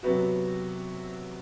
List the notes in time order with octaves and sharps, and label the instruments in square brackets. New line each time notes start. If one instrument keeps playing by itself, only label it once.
[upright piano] C3 F#3 B3 F#4